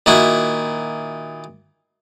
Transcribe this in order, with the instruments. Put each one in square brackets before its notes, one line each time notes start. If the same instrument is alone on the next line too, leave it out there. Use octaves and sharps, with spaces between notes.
[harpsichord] A#2 D#3 E4 F#4